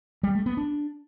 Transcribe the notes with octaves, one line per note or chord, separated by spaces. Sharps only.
G3
A3
B3
D4